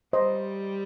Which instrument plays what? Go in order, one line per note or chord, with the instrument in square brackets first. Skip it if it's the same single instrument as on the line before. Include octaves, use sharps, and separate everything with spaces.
[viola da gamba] G3 [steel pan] C5 D#5